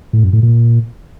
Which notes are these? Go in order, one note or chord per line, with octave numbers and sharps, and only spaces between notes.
A2
F#2
A2
A#2